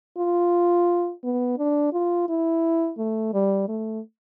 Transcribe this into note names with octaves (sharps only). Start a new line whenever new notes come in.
F4
B3
D4
F4
E4
A3
G3
A3